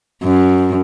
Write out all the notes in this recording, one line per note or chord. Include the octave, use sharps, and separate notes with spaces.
F#2